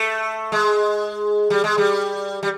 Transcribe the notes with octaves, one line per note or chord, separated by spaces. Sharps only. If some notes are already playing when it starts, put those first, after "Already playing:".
Already playing: A3
G#3
G3
G#3
G3
G3